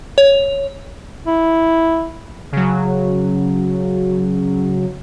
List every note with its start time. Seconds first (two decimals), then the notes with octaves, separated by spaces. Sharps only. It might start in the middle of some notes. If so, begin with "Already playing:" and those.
0.18 C#5
1.27 E4
2.52 C#3 F#3